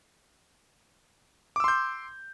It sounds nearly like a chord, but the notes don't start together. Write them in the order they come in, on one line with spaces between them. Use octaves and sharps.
D6 E6 C6 G6